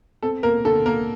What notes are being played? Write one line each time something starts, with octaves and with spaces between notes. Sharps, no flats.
C4 A4
A#3 A#4
D3 A4
A#3 A#4